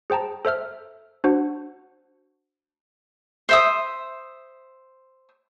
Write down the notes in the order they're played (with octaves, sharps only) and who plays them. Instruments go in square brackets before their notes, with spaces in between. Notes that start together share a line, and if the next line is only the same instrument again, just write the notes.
[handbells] G#4 C5 G5 A5 A#5
A4 C5 E5 F6
D4 F#4 C5 F#5
[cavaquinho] C5 E5 D#6